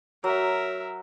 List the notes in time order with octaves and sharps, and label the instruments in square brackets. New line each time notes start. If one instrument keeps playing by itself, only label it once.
[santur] F#3 [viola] A#4 E5